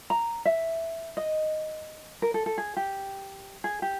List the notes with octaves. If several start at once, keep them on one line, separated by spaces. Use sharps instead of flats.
A#5
E5
D#5
A#4
A4
A4
G#4
G4
G#4
G4